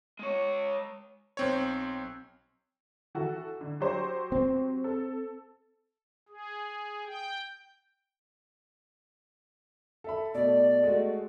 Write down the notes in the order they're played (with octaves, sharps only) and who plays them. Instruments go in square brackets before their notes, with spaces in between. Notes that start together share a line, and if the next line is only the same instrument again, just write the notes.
[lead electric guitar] G#3 C#5
[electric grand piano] B1 C4 C#5
[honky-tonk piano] E3 F#4 A4
D3
F#3 G4 C5
[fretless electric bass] C4
[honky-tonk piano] A4
[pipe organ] G#4
G5
[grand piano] A4 E5 B5
[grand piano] B2 A3 [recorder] D5
[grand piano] G#3 A3 F#4